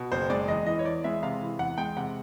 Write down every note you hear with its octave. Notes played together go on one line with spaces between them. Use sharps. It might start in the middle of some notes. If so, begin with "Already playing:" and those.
Already playing: B2
F#1 C5
G#3 D5
E2 D#5
E3 D#5
C#5
E2 D5
G#3 E5
C3 F5
E3
E2 F#5
G#3 G5
C3 F#5